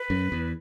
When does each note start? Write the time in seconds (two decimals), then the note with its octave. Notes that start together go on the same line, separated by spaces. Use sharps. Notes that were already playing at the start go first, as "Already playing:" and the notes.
Already playing: B4
0.10 F#2
0.32 E2